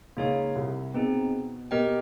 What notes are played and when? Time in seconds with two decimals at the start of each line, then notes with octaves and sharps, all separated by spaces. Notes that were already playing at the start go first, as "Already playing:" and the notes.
0.17 C#2 C#3 A#3 D#4 G#4 C#5 F5
0.56 C2 C3
0.94 B2 C4 D#4 G#4
1.71 B2 G4 A#4 D#5 G5